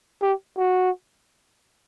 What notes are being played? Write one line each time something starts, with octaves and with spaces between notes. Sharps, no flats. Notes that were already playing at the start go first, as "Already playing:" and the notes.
G4
F#4